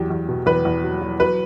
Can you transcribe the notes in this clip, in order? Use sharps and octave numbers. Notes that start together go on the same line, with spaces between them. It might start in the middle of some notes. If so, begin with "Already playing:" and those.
Already playing: E2 F#3 G4
E2
B2
E2 B4
E2
F#3
F#3
F#3 B4